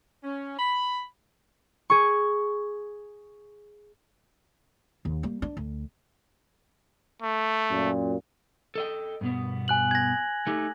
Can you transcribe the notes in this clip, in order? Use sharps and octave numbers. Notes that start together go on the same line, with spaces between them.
C#4
B5
G#4 C#6
D#2
G3 A#3
D4
D2
A3
F#2 A#2
A4 D#5 G5
G2 B2 B3
G#5 F#6 F#7
G#6 A#6
A3 D#4 G4